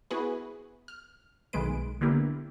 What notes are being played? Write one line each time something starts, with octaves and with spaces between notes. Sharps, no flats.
B3 E4 F#4 G#4 B4
F6
B1 D#3 G#3 A3 B4 D7
D3 A#3 B3 E4 G4 A#4